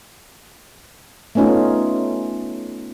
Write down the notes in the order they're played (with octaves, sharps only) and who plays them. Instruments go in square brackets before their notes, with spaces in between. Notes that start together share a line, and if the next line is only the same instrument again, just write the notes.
[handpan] A3 B3 C#4 D#4 F4